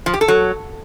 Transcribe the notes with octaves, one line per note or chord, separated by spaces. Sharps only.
F3
G4
A4
F#3